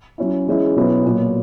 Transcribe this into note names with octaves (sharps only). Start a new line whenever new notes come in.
F#3 C#4 E4
E3 G#3 C#4 E4
B2 F#3 B3 E4 B4
A#2 F#3 B3